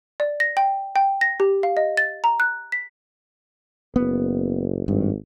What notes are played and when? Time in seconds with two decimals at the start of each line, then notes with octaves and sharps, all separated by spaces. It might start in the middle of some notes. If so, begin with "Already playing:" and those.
0.20 D5
0.40 A#6
0.57 G5
0.96 G5
1.21 A#6
1.40 G4
1.63 F5
1.77 D#5
1.97 A6
2.24 A#5
2.40 F#6
2.72 B6
3.96 F#1 B3
4.88 G#1 G2